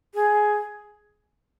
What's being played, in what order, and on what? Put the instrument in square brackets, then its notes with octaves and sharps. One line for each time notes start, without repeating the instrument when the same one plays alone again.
[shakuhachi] G#4